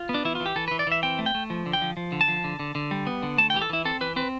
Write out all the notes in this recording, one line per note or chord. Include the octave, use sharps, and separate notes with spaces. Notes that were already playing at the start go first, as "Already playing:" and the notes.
Already playing: F4
B3
D4
E3 E4
F4
E3
G4
E3 A4
B4
E3
D5
E3 E5
C4 G5
A3
G5
A3
F3
D3
G5
F3
F3
D3
A5
F3
D3
D3
D3
G3
B3
D3
A3 A5
G5
E3 G4
A4
E3 E4
C4 A4
E3 B4
C4 B4